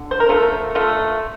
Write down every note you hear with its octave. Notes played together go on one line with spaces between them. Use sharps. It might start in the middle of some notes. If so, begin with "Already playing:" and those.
Already playing: D3
C5
A#4
A3 F4 A4
A3 F4 A4